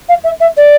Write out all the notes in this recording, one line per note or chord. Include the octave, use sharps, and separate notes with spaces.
F5
E5
E5
D5